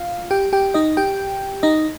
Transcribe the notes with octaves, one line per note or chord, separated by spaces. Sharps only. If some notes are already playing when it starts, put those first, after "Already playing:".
Already playing: F4 F5
G4 G5
G4 G5
D#4 D#5
G4 G5
D#4 D#5